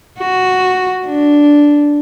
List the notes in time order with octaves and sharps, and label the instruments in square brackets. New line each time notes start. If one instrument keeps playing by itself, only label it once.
[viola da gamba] F#4
D4